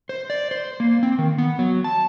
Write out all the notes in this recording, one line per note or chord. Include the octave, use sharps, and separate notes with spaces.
C5
D5
C5
A#3
C4
D#3
B3
F#3
A5